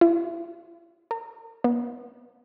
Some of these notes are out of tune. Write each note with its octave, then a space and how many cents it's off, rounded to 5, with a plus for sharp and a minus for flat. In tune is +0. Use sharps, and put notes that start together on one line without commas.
E4 +45
A#4 -40
B3 -40